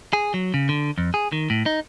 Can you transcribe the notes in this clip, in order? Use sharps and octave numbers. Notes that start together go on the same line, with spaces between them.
G#4
F#3
C#3
D3
F2
G#4
D#3
A2
D#4